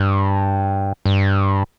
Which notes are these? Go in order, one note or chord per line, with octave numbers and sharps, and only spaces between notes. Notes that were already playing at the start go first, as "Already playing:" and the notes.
Already playing: G2
G2